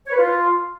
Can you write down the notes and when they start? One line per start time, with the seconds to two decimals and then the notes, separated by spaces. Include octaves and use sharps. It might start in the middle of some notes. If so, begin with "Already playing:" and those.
0.07 C#5
0.12 B4
0.18 F4